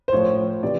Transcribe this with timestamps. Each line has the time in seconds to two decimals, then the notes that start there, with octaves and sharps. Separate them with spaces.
0.08 C5
0.13 A2 F3 C#5
0.63 C3 E3 D5